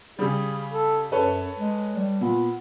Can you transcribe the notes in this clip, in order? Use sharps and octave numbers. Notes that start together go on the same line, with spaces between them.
C#3 G3 G#4
A4
F#2 A4 B4 C#5
G#3
G3
A#2 B3